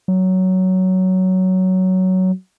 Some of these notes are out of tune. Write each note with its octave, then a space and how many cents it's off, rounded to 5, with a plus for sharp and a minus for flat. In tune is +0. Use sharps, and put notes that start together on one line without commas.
F#3 +10